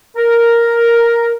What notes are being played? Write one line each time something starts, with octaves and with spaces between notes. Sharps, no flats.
A#4